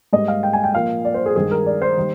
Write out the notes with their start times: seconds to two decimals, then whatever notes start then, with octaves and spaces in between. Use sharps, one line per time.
0.13 G#2 G3 A#3 D#5
0.28 F5
0.43 G5
0.53 G#5
0.64 G5
0.74 A#2 F3 A#3 F5
1.05 D5
1.14 C5
1.26 G#4
1.36 G2 D#3 G#3 G#4
1.51 A#4
1.66 D5
1.82 C5
1.97 D#3 G3 A#3